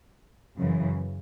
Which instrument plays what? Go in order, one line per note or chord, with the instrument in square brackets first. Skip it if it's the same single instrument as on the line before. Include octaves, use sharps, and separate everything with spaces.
[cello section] F#2 C#3 E3